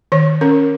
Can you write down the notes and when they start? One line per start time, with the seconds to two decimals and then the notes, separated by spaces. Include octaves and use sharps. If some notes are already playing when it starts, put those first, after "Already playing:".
0.12 D#3 C#5
0.41 C#4 A#4